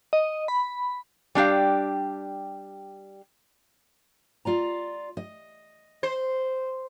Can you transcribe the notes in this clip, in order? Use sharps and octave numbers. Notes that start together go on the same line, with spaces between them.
D#5
B5
G3 D4 G4 F5
F4 D5 A#5
D#5
C5